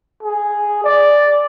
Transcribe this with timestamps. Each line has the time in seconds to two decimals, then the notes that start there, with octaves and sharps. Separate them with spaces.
0.23 G#4
0.85 D5